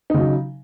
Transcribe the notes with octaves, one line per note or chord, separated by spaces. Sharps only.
C#3 F#3 D#4